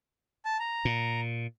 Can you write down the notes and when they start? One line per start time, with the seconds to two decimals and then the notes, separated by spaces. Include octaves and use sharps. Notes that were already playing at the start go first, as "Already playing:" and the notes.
0.45 A5
0.60 A#5
0.85 A#2